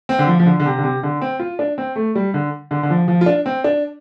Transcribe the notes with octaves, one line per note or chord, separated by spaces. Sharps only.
C4
D3
F3
F3
D3
D3
C3
D3
C3
D3
C4
F4
D4
C4
A3
G3
D3
D3
D3
F3
F3
F4
D4
C4
D4